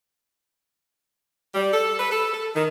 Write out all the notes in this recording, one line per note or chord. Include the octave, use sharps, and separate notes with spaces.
G3
A4
B4
A4
A4
D#3